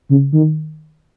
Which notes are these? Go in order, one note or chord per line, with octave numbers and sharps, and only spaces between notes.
C#3
D#3